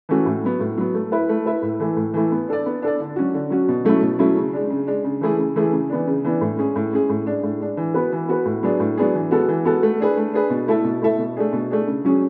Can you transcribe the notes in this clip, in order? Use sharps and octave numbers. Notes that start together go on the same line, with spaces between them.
E3 A3 C#4 F#4
A2
F#3 B3
A2
F#3 B3
A3
E4 B4 E5
A3
E4 B4 E5
A2
E3 A3 E4
A2
E3 A3 E4
B3
D4 A4 D5
B3
D4 A4 D5
D3
F#3 C#4 F#4
D3
F#3 C#4 F#4
B2
F#3 A3 C#4 E4
B2
F#3 A3 C#4 E4
C#3
G#3 D4
C#3
G#3 D4
C#3
E3 A3 E4 G#4
C#3
E3 A3 E4 G#4
C#3
E3 B3 D4
C#3
E3 B3 D4
A2
G#3 C#4 G#4
A2
G#3 C#4 G#4
A2
G#3 D4
A2
G#3 D4
E3
B3 F#4 B4
E3
B3 F#4 B4
A2
F#3 B3 D4 G#4
A2
F#3 B3 D4 G#4
E3
G#3 B3 F#4 A4
E3
G#3 B3 F#4 A4
A3
D4 G#4 B4
A3
D4 G#4 B4
B2
A3 E4 A4 E5
B2
A3 E4 A4 E5
B2
A3 D4 G#4
B2
A3 D4 G#4
C#3
F#3 C#4 G#4